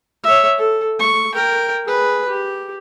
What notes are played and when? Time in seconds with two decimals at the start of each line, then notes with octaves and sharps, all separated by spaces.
0.23 C#5 E5
0.58 A4
0.99 C#6
1.35 A#4 G5
1.86 G#4 B4
2.28 G4